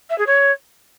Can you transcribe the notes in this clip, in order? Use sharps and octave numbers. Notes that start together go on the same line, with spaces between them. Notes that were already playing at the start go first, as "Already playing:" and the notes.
E5
G#4
C#5